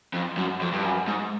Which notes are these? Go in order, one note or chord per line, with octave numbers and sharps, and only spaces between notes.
F2
F#2
F2
G2
F#2
G#2